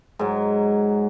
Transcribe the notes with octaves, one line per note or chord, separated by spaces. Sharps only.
G#2 F#3